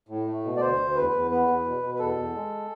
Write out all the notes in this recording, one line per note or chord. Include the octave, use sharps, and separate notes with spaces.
A2
A3
B2
D5
D2 C5
D2
E2 B4
E2
B3 B4
E2
B2
B2
B4
E2 A4
E2
G#3